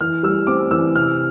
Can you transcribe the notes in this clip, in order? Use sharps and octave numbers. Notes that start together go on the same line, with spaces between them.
E3 F6
G3 E6
C4 D6
E3 E6
C3 F6